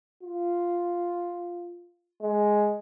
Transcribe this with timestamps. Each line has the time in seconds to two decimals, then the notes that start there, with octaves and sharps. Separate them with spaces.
0.23 F4
2.22 G#3